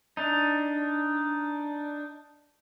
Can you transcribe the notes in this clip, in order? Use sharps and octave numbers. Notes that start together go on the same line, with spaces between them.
D4 D#4